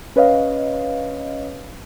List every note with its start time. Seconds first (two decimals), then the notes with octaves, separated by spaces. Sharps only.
0.16 C#4 B4 C#5 D#5 F5